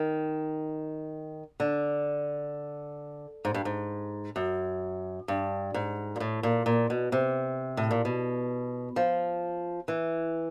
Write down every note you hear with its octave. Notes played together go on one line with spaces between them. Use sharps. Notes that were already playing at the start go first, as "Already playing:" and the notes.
Already playing: D#3
D3
G#2
G2
G#2
F#2
G2
G#2
A#2
A2
A#2
A#2
B2
C3
A2
A#2
B2
F3
E3